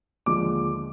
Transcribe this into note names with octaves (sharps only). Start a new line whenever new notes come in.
D#2 D3 F3 G#3 D6